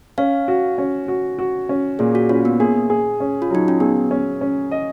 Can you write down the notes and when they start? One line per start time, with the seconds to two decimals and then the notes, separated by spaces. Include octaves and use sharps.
0.18 C#4 F5
0.48 F#4
0.78 C#4
1.08 F#4
1.39 F#4
1.69 C#4
1.99 A#2 G#4
2.15 F#4
2.29 C#4 F4
2.45 B3
2.60 A#3 G#4
2.90 G#4
3.20 C#4
3.42 F4
3.51 F#3 D#4
3.68 C#4
3.80 B3 G#4
4.11 C#4
4.41 C#4
4.71 D#5